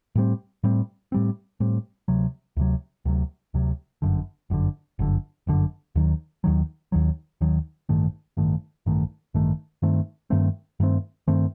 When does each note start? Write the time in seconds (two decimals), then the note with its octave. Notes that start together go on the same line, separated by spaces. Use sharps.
0.15 A2 G3 C4
0.63 A2 G3 C4
1.12 A2 G3 C4
1.60 A2 G3 C4
2.08 D2 C3 F#3
2.57 D2 C3 F#3
3.05 D2 C3 F#3
3.54 D2 C3 F#3
4.02 G1 F#2 D3
4.50 G1 F#2 D3
4.99 G1 F#2 D3
5.47 G1 F#2 D3
5.95 D#2 D#3 F#3
6.44 D#2 D#3 F#3
6.92 D#2 D#3 F#3
7.41 D#2 D#3 F#3
7.89 A1 G2 D#3 A3
8.37 A1 G2 D#3 A3
8.86 A1 G2 D#3 A3
9.34 A1 G2 D#3 A3
9.82 G2 D#3 A3 C4
10.30 G2 D#3 A3 C4
10.80 G2 D#3 A3 C4
11.28 G2 D#3 A3 C4